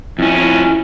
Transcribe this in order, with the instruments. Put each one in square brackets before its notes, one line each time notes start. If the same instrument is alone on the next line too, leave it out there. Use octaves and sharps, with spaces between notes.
[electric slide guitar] F2 C#4 [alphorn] E4